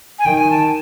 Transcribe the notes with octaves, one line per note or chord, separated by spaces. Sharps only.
G#5
D#3 G5
G#5
A5